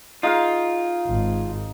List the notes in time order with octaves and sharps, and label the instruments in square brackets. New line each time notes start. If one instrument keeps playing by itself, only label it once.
[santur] D#4 G#4 F5 [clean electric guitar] F4
[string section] G#1